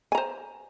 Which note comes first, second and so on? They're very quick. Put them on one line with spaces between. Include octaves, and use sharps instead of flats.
G#5 A#5 C5